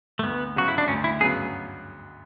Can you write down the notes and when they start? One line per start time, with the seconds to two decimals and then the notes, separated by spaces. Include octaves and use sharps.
0.19 A3
0.23 D2 B3
0.56 C#3 F#3 B3 F#4
0.68 E4
0.78 D4
0.88 D2 C#4
1.04 E4
1.21 C#3 F#3 B3 G#4